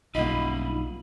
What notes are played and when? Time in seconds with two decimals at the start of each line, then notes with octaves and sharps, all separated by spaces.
0.15 B1 G2 A#3 D#4 F4 D#5 B5